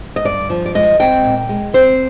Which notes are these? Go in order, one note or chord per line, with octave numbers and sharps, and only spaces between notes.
D#5
G2 D5
F3
D5
G#3 D#5
C4 G5
A#2
G#3
C4 C5